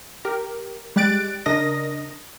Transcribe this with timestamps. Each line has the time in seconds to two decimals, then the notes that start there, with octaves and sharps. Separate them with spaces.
0.25 G4 A#4
0.96 G3 G#3 G4 F#6 A6 D7
1.46 C#3 D4 A#4 D#5 D#6 A#6